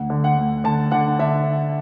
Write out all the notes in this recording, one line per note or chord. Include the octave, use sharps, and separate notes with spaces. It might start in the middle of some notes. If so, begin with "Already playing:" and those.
Already playing: D2 F#5
D3
F#5
D2
D3 A5
D3 F#5
D3 E5